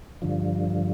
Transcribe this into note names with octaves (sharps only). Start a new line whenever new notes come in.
G2 D3 F3